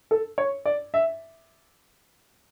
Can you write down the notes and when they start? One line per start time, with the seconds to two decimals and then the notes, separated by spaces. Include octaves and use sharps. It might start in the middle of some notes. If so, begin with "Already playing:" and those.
0.11 A4
0.38 C#5
0.65 D5
0.94 E5